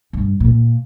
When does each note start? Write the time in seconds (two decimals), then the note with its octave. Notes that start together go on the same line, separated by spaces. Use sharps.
0.13 G2
0.40 A#2